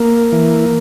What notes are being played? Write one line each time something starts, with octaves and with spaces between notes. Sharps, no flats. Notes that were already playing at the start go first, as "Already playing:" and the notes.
Already playing: A#3
E3